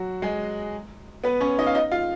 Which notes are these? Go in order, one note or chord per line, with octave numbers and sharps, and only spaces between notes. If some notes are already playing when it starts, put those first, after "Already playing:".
Already playing: F#3 F#4
G#3 G#4
B3 B4
C#4 C#5
D#4 D#5
F5
D#4 D#5
F4 F5